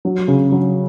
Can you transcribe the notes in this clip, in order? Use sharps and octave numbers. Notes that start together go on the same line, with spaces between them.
F#3
C#3
F#3